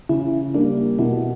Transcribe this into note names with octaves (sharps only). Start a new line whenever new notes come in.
C#3 E4
G3 A#3 D4
B2 E4